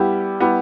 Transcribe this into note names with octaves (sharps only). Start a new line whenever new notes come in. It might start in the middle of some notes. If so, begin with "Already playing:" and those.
Already playing: G3 B3 E4 G4
G3 B3 E4 G4